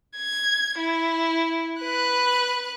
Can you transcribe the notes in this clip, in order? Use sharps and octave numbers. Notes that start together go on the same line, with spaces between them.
G#6
E4
B4 F#6